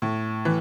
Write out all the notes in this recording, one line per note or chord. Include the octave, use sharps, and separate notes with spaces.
A2
E3